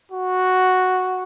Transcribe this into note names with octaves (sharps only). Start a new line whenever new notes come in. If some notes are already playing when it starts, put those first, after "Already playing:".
F#4